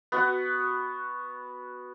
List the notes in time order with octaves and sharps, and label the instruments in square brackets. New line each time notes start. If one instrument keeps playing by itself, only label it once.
[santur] B3 F#4 F#5